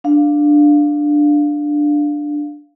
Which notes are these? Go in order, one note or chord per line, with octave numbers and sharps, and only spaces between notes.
D4 F5